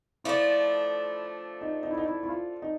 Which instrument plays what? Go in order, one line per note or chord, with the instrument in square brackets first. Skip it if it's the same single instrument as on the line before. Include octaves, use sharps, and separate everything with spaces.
[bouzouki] F3 A3 D4 [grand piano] E4
[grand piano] D#4
D#4
E4
D#4
E4
E4
F4
D#4